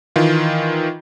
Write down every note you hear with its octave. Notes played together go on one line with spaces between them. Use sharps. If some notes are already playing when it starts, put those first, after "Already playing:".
D#3 E3 F4